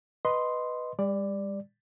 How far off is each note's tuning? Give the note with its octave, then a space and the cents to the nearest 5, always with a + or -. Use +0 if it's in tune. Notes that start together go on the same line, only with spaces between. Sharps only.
B4 +0 D#5 +0 C6 +0
G3 +40 D5 +0